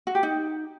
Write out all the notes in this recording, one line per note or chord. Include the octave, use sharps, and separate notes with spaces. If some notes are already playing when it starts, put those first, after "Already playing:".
F#4
G4
D#4